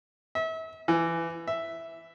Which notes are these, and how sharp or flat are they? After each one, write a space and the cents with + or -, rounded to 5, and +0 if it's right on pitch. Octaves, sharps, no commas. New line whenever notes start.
E5 -35
E3 +15
E5 +0